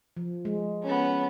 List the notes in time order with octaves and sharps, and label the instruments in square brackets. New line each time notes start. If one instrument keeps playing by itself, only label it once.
[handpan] F3
G#3
[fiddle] B3 C#4